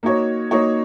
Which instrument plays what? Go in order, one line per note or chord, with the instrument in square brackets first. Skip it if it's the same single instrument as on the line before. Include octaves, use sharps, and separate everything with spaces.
[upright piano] A#3 D#4 F#4 C#5
A#3 D#4 F#4 C#5